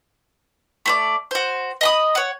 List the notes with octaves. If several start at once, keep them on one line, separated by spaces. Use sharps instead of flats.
A3 C5 D5
F#4 C5
D#5 B5 D#6
C#5 F#5